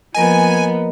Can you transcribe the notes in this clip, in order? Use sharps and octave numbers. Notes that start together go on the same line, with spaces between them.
F3 A#3 B3 A#4 D#5 G#5